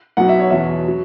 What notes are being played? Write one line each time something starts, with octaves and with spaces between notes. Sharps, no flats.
B1 B2 F#3 F#5
E5
C#5
E2 B2 F#3 E5
F#3